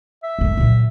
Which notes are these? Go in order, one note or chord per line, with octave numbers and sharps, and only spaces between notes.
E5
F#2 A3
A#2 F#3